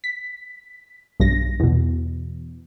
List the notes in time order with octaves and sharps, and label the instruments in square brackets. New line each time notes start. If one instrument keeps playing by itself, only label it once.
[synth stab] B6
B1 G2 A#6
E2 B2